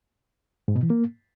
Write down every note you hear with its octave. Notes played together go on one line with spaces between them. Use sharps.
G#2
B2
E3
A#3